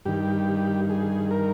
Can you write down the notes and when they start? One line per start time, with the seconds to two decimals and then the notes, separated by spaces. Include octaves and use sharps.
0.05 G2 D#3 G4
0.90 G#4
1.31 A#4